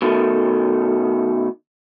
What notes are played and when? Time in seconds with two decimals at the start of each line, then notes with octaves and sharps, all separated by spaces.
0.02 B2 D#3 A3